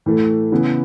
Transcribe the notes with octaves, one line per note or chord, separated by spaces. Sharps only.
A2 E3 A3
C#3 E3 B3 E4